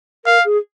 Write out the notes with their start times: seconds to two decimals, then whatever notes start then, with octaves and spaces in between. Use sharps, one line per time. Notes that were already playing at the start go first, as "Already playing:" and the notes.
0.25 A#4 F5
0.44 G#4